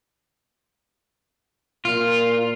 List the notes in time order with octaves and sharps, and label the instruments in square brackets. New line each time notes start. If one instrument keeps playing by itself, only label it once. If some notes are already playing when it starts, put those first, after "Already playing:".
[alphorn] A#2 [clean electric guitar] F4